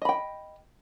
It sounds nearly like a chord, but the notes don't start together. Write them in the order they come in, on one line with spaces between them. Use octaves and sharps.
D#5 B5 G5